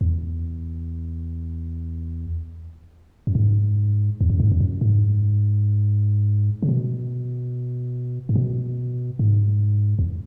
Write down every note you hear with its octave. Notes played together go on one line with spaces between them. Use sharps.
E2
F#2
G#2
E2
F#2
G#2
E2
F#2
G#2
C#3
B2
G#2
B2
G#2
E2